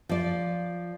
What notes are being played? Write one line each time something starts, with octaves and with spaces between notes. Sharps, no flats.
F3 D5